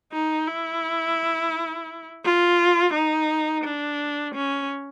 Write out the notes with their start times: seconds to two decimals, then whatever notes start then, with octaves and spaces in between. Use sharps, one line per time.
0.12 D#4
0.47 E4
2.24 F4
2.94 D#4
3.64 D4
4.35 C#4